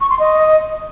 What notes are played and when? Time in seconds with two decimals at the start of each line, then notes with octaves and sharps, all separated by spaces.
0.01 C#6
0.10 C6
0.19 D#5